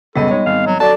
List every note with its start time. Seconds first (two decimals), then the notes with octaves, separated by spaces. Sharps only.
0.16 C#2 F#2 B2 G3 B3 A4 D#5
0.31 G#3 D#4 C#5
0.46 G#1 F5
0.66 F#3
0.80 F#3 A4 D5 A5